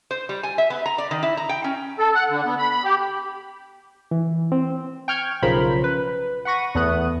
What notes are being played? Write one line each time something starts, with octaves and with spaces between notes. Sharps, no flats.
C5
G3
G#5
E5
B3
A#5
D5
D#3
E4
A#5
G5
C#4
A4
F#5
D3
B3
B5
B5
G4
E3
C4
G5 C#6 F6 G6 G#6
B1 C#3 F3 A#4 C5 B5
B4
F#5 B5 C#6 A#6 D#7
E2 A3 B3 D#6 F#6 D#7